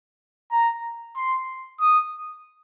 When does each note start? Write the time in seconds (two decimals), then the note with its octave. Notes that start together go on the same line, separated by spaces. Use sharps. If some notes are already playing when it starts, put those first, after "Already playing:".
0.52 A#5
1.16 C6
1.80 D#6